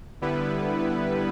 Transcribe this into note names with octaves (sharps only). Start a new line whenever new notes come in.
D3 G3 B3 E4 B4